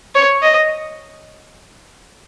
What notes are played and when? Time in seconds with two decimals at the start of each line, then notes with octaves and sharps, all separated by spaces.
0.15 C#5
0.43 D#5